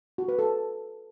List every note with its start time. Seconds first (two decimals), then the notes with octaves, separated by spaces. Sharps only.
0.18 F#4
0.28 B4
0.39 A4